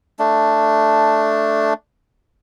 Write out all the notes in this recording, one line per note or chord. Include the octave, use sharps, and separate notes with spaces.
A3 D4